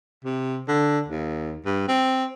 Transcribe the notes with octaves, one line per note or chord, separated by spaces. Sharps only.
C3
D3
D#2
G2
C4